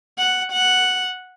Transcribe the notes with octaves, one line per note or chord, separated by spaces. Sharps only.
F#5
F#5